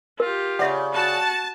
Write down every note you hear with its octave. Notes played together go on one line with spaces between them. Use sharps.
F4 G4 A#4
C#3 D5 E5 F#5
F#4 A5